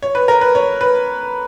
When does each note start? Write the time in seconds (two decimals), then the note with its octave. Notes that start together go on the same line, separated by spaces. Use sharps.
0.03 C#5
0.15 B4
0.28 A#4
0.41 B4
0.55 C#5
0.81 B4